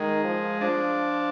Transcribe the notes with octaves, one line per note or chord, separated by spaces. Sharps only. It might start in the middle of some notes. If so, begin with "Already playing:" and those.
Already playing: D#3 G#3
F3
F3 D4